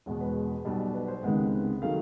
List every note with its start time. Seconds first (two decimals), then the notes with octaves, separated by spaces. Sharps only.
0.06 E1 E2 B2 G#3
0.21 B4
0.65 B1 B2 G3
0.94 B4
1.08 C5
1.23 C#2 C3 D#3 G#3 B3 F#5
1.82 D#3 F#3 A3 F5